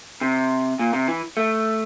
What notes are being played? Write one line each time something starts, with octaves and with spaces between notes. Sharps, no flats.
C3
A#2
C3
E3
A3